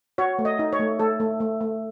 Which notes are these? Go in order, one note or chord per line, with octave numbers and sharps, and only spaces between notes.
F#4 C#5
A3
D#5
D#4
C#5
A3
A3 A4
A3
A3
A3